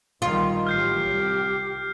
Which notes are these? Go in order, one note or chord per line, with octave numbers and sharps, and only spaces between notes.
A#1 D#3 G3 F4
A1 F#3 G4 F6 G6 C7
C2